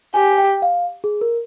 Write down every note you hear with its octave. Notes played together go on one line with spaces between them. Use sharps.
G4 G#5
G5
F5
G#4
A#4